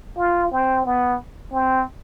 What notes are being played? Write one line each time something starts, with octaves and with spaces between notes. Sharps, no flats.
F4
C4
B3
C4